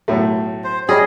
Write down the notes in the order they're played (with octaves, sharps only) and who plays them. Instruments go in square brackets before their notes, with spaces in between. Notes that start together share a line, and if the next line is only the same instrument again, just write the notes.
[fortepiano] B1 A2 A3
[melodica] C5
[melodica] G3 C#4 D#5 [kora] G#4